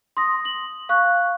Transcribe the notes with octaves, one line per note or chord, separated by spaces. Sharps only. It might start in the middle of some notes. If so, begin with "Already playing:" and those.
C6 D#6 A#6
F#7
F5 C#6 F#6